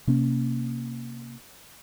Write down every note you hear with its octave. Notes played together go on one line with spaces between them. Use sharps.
C3 A#3 C#4